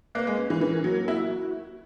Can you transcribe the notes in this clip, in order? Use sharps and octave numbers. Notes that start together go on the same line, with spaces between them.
A#3 B4
G#3
C#4
E3
E3 A#4
F#3 A#3
E4 F#4